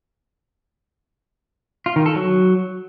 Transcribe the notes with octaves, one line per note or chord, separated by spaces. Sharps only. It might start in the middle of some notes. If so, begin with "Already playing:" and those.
F4
D#3
A4
F#3